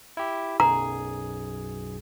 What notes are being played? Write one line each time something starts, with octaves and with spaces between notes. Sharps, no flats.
E4 G4
B1 F#2 G#4 A#5